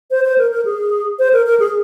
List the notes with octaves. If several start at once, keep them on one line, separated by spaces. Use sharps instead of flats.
C5
C5
A#4
A#4
G#4
C5
A#4
A#4
G#4